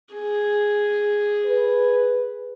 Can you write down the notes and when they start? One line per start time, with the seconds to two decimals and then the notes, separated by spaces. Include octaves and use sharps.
0.15 G#4
1.45 B4